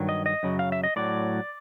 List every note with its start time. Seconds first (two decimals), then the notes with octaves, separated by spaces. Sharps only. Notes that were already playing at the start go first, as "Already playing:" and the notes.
Already playing: G2 D#3 F#3
0.09 D#5
0.26 D#5
0.43 F#2 C#3 F#3
0.59 F5
0.72 E5
0.84 D#5
0.96 A2 F#3 D5